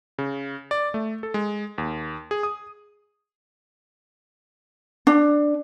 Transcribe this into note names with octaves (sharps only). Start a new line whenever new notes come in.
C#3
D5
A3
A4
G#3
D#2
G#4
D#6
D4